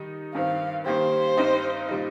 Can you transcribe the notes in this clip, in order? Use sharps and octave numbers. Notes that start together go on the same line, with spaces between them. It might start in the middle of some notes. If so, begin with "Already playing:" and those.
Already playing: D#3 G3 D#4
G2 D#3 C4 F5
D#3 G3 A#3 G4 C5
G2 G3 C4 D#4 G4
A#2 G3 D#4